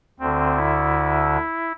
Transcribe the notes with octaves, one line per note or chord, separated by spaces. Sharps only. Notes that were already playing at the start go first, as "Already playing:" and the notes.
D2 D3 C4
E4